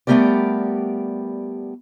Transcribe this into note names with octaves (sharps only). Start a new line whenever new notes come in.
G3 A3 B3 G4 A#4 D5